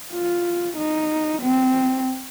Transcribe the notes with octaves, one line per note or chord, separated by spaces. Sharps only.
F4
D#4
C4